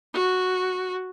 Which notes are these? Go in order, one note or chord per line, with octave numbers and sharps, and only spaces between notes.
F#4